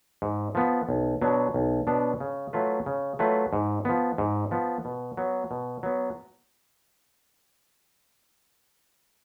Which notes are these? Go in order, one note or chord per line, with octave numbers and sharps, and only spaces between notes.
G#2
F3 B3
B1
B2 F#3 B3 D4
B1
B2 F#3 B3 D4
C#3
F#3 A3 F4 B4
C#3
F#3 A3 F4 B4
G#2
F3 B3
G#2
F3 B3
B2
F#3 B3
B2
F#3 B3